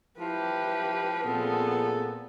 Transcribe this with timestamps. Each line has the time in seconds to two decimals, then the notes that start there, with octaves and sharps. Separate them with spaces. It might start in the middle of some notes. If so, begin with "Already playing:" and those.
0.20 F3 E4 G4 B4
1.26 A#2 B3 C4 G#4 A4